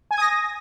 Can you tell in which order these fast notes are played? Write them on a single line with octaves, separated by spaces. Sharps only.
G#5 G#6 D#6 A#6